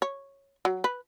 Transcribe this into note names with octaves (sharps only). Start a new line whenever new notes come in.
C#5
F#3
B4